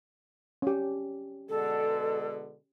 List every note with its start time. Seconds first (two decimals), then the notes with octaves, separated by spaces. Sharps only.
0.62 C#4 G4
1.49 B2 D3 G#3 A4